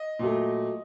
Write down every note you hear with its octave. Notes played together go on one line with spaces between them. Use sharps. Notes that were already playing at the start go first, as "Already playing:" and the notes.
Already playing: D#5
A#2 F#3 A3